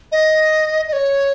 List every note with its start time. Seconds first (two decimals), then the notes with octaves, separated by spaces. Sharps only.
0.12 D#5
0.88 D#5
0.93 C#5